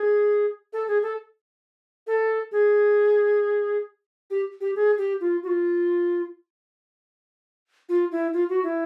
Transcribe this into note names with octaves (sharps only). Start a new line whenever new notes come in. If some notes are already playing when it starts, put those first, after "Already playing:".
Already playing: G#4
A4
G#4
A4
A4
G#4
G4
G4
G#4
G4
F4
F#4
F4
F4
E4
F4
F#4
E4